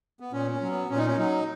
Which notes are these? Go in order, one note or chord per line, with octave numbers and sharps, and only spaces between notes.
B3
A#2 C#4
C#4
F#3
B3
A#2 C#4
D#4
C#4
F#3 D#4